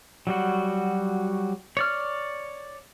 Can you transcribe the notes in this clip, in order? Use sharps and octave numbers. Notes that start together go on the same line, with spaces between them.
F#3 G3 F#4
C#5 D5 F6